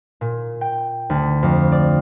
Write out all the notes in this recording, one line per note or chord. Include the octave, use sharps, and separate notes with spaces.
A#2
G5
D2
F2
D5